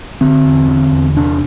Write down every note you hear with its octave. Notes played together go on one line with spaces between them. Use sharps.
D3 C4
E2
D3
E2
C3 D4